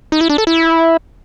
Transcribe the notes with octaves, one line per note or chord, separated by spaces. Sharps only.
D#4
E4
D4
A4
E4